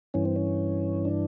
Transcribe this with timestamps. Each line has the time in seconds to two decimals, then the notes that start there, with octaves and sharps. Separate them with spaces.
0.14 G2 E3 C#4
0.25 C4
0.36 C#4
1.05 D4